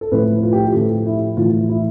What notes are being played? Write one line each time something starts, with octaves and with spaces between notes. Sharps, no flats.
A4
A2 F3 A3 B4
F4
G4
F4
A2 F3 A3 A4
E4
A2 E3 A3 F4
E4